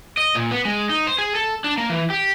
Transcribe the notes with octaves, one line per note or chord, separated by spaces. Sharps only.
D#5
A#2
B3
G#3
D#4
C5
G#4
A4
D4
A#3
E3
G4